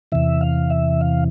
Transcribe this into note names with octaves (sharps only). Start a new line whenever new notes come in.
E2 C3 E3 E5
F5
E5
F5